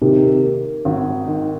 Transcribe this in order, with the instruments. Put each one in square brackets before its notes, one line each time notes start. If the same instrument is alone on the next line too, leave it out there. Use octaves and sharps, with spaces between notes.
[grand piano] C3 D#3 [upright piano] A#3
[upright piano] A#3
G#1
D#3